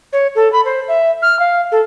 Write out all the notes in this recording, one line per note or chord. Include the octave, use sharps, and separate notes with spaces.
C#5
A4
B5
C5
E5
F6
F5
A4